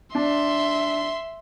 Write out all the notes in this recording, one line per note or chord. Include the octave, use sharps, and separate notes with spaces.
D4 E5 C6